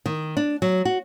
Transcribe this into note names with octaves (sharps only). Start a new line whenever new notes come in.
D#3
D4
F#3
F#4